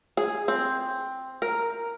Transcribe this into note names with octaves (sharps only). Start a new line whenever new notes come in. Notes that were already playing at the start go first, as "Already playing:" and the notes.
G#4
C4
A#4